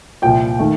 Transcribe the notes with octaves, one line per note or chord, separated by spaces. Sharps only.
C2 A#2 F3 G5
D#3 A3